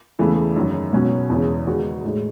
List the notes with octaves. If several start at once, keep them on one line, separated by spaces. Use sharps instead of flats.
E2 C#3 E3 A3
F#2 D#3 F#3
B2 F#3 C#4 F#4
E2 C#3 E3 G#3 C#4
D#3 G#3 B3 D#4 F#4
A2 G#3 D#4